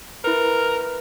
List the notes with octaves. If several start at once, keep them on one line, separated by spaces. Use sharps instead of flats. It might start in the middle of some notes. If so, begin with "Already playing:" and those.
E4 A#4 B4